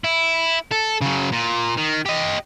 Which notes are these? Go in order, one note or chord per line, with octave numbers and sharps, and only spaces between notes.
E4
A4
C#3 F#3
A#2
D#3
G4 D#5